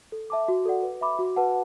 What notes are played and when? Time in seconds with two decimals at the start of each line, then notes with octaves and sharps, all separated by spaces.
0.12 A4
0.30 E5 A5 D6
0.48 F#4
0.66 A4 D5 F#5
0.83 B4
1.01 E5 B5 D6
1.19 F#4
1.36 B4 F#5 A5